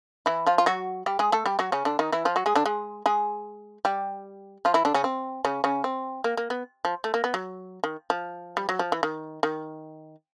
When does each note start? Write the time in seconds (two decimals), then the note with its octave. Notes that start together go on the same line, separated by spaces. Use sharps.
0.26 E3 E4
0.46 F3 F4
0.58 F4
0.66 F#3 F#4
1.06 G3 G4
1.19 G#3 G#4
1.32 A3 A4
1.46 G3 G4
1.59 F#3 F#4
1.72 C#3 C#4
1.85 D3 D4
1.99 D#3 D#4
2.12 E3 E4
2.25 F3 F4
2.36 F#3 F#4
2.46 G#3 G#4
2.55 D3 D4
2.66 G#3 G#4
3.06 G#3 G#4
3.85 G3 G4
4.65 F3 F4
4.74 E3 E4
4.85 D3 D4
4.94 C#3 C#4
5.04 C4
5.45 C#3 C#4
5.64 C#3 C#4
5.84 C4
6.24 A#3
6.37 A#3
6.50 B3
6.85 F3
7.04 A3
7.14 A#3
7.24 B3
7.34 F#3
7.84 D#3
8.10 F3
8.57 G3
8.69 F#3
8.79 F3
8.92 E3
9.03 D#3
9.43 D#3